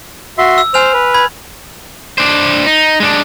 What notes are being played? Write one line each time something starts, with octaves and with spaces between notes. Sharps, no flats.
F#4 E5 C6
E6
C5 G#5 F6 F7
B4
B5 G#6
D4 C5
D#4
G#3 D4